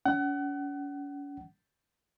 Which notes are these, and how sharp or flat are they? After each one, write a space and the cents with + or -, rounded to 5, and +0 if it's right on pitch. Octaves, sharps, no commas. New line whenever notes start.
C#4 +40 F#5 +30